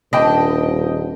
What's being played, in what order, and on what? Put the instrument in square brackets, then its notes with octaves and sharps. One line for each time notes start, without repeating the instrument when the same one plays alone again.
[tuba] D#1 [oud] D4 [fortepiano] D#5 G5